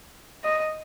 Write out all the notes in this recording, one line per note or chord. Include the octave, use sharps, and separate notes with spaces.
D#5